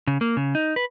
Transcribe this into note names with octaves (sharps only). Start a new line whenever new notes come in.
C#3
A#3
C#3
D#4
B4